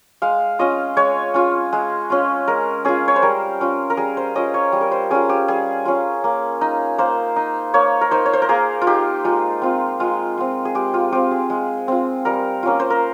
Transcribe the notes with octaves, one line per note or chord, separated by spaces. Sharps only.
G#3 F5
C#4 F4 D#5
G#3 C#5
C#4 F4
G#3
C#4 F4
G#3 A#4
C#4 F4 G#4
C#5
C5
G3 A#4
C#4 F4
A#4
G3 G#4
C5
C#4 F4 D#5
C#5
G3
A#4
C5
C#4 F4 G#4
G4
G3 G#4
C#4 F4
A#3
D#4
A#3 C5
D#4
A#3 C#5
A#4
D#4 C5
C#5
C5
A#4
A#3 G#4
F4
D#4 G4
G#3 F4
C4 F4
G#3 F4
C4 F4
G#4
G#3 G4
F4
C4 F4 G4
G#4
G#3
C4 F4
G3 A#4
A#3 C#4 F4
C5
A#4